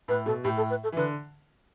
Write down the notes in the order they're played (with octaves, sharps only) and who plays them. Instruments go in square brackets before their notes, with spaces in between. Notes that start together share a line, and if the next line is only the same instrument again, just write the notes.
[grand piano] A2 [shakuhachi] B4
[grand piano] B2 [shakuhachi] A4
[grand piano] A2 [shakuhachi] G4
[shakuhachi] A4
B4
A4
[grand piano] E3
[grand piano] D3 [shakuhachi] B4